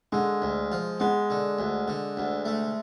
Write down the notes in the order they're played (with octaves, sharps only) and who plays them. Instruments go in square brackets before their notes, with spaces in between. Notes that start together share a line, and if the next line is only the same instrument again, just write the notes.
[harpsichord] D3 [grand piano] G#3
[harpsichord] D2
F3
[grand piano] G#3 [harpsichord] B3
[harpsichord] D3
D2
D3
D2
A3